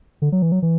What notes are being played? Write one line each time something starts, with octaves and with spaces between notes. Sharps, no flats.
D3
F#3
E3
F#3
E3